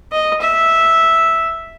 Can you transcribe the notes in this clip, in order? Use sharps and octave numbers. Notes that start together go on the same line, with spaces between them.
D#5
E5